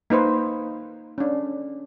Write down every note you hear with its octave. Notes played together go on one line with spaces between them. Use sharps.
A#3 D#4 B4 C5
C#4 D4